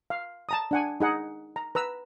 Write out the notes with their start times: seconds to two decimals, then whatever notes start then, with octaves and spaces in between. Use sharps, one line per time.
0.10 F5
0.49 A5 A#5 D#6
0.71 D4 F#5 G#5
1.00 D#4 G#4 F#5
1.56 A#5
1.75 B4 A#5 E6